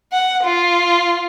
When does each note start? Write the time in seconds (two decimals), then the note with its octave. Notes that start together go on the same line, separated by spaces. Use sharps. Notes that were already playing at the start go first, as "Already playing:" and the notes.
0.12 F#5
0.44 F4